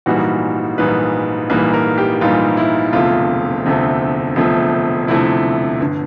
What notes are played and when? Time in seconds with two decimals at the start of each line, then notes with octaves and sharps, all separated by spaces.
0.06 A#1 G#2 E3 G3 A#3 F#4
0.78 A#1 G#2 E3 G3 A#3 B4
1.50 A#1 G#2 E3 G3 A#3 B4
1.73 A#4
1.98 G4
2.21 A#1 G#2 E3 G3 A#3 F4
2.57 E4
2.93 E1 D2 C3 F3 A3 F4
3.65 E1 D2 C3 F3 A3
4.36 E1 D2 C3 F3 A3
5.08 E1 D2 C3 F3 A3 E4
5.80 G1 D3